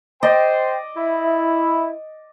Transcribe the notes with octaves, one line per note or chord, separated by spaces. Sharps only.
C5 D5 D#5 G5
E4